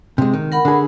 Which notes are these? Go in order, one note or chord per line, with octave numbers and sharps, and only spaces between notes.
C3 G#3
D#3
A#4 F#5 B5
D3 G#4